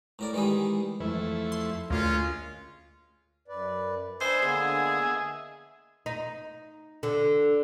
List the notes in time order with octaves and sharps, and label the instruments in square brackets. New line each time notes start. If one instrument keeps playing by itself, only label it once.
[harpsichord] A2 A#4 D5
D#3 E3 G3 G#3 G#4
[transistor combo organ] F2 A3 E4 [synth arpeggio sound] E3
[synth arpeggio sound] C6
[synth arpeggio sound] D2 [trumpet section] G#3 C#4 F4 [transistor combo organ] A#3
[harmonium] F#2 B4 D5
[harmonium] D4 B4 [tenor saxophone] C5 [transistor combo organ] D#5 E5 G#5
[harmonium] D3 A#3 B3 [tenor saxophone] G#4
[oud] D#4
D3